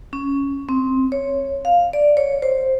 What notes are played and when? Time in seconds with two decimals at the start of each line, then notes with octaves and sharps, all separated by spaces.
0.13 C#4
0.69 C4
1.12 C#5
1.65 F5
1.93 D5
2.17 C#5
2.42 C5